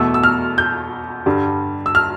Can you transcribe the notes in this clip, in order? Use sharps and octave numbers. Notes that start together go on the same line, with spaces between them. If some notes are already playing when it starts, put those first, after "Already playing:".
Already playing: E2 B2 A3 E6
E6
F6
G6
G2 D3 G3
E6
F6